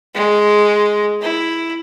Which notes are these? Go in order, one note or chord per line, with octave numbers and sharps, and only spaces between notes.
G#3
E4